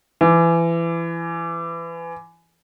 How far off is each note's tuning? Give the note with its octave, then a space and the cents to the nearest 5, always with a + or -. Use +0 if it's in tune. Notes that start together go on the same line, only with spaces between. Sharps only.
E3 +25